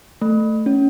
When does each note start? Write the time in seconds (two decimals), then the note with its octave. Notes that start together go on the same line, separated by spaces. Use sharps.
0.22 A3
0.66 C#4